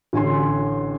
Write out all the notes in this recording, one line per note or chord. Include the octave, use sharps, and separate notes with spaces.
A1 D3 G#5 C6